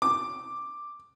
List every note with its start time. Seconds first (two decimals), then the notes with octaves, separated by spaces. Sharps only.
0.02 D6